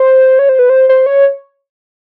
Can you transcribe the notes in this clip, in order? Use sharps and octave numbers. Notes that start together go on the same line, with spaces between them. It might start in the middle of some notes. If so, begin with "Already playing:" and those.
Already playing: C5
C#5
C5
B4
C5
C5
C#5